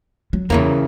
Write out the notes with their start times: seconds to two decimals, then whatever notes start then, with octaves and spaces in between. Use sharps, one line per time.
0.33 F#3
0.50 E2 C#3 E3 A#3